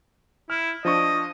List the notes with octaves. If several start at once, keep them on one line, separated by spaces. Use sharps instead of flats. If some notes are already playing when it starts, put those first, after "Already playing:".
E4 F6
F3 D4 D#5 C#6